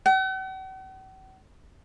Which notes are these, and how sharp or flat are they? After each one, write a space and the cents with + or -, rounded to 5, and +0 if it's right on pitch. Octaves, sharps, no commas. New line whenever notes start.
F#5 +45